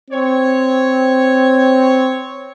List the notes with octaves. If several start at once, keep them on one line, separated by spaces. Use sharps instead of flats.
C4 C#5